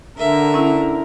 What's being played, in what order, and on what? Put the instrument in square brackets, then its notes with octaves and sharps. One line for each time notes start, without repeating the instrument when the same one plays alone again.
[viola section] D3 A#4 [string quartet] E5
[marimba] C#4 E4